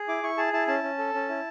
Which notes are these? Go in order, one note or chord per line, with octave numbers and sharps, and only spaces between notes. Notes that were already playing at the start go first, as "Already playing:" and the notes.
Already playing: G#4
E4 D6
E4 C#6
G#4 A5
E4 A5
C#4 A5
C#4
A4
C#4
E4